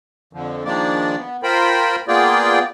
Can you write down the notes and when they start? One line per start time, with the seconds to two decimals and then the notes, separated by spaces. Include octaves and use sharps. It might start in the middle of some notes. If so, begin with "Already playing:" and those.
0.33 F2 D3 F3
0.65 D#3 F3 G#3 A#3 D4 D5
1.17 B3
1.43 F4 A#4 C5 G5 B5
2.08 A#3 B3 F4 G#4 D5 G5